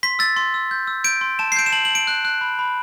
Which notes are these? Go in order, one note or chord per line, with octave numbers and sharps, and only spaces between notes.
C6 B6
E6 A6
C6
E6
G6
E6
G6 D7
C6
A5 E7
C7
G6 D7
E7
A5 F#7
F#7
A5 D7
F#6
F#6
B5
B5